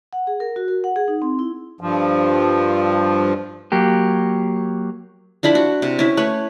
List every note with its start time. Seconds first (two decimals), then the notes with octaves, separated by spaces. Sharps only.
0.13 F#5
0.27 G#4
0.40 A#4
0.56 F#4
0.68 A#4
0.84 F#5
0.96 G#4
1.08 D#4
1.22 C4
1.39 E4
1.81 G2 F3
3.72 F#3 A#3 G4
5.43 F3 D4 E4 B5
5.55 F#4
5.82 C3
5.99 C#4 E4
6.17 A3 B4 C#5